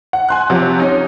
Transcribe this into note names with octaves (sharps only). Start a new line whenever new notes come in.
F#5
G#5 C6 F#6
C3 F3 F#3
C#4 D#4